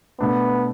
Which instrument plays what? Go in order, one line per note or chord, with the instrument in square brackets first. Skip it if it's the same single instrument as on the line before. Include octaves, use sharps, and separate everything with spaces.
[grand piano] B2 A3 D4 [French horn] B3